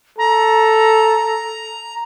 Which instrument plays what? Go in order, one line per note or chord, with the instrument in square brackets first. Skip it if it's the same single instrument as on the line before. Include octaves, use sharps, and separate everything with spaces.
[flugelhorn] A4 [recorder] A#5